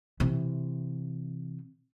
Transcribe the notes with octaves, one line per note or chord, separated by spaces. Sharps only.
C3 E3